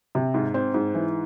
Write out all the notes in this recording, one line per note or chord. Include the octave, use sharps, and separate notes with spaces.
C3
G#2
C4
G#2
E3